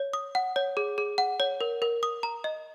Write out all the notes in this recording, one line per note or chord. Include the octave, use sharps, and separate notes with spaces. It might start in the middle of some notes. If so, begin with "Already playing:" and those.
Already playing: C#5
D#6
F#5
C#5
G#4
G#4
F#5
C#5
A#4
A#4
D#6
A#5
D#5